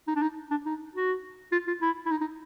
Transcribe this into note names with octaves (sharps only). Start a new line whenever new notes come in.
D#4
D4
D#4
D4
D#4
F#4
F4
F4
E4
E4
D#4
D#4